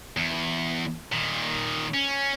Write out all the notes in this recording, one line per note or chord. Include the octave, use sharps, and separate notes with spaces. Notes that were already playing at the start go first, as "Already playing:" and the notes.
E2
A#2 D#3
C#4